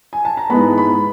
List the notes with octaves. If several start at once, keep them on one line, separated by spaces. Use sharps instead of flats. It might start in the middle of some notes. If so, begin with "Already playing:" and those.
G#5
A5
A#5
G#2 E3 G#3 B3 B5
B5